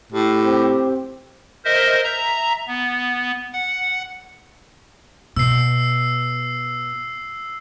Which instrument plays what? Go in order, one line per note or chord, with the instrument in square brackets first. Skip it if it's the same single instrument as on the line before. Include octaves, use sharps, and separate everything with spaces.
[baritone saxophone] A2 [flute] G4
[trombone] C4
[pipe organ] A#4 C5 D#5 E5
E5 A#5
B3
F#5
[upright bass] B2 [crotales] E6 C7